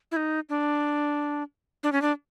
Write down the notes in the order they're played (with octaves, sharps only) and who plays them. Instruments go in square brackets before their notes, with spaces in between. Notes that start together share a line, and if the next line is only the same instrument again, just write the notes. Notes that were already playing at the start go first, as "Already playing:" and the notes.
[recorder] E4
D#4
D4
D4
C#4
D4